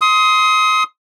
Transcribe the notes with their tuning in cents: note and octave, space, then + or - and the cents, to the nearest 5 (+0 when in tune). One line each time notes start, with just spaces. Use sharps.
C6 +0 D#6 +25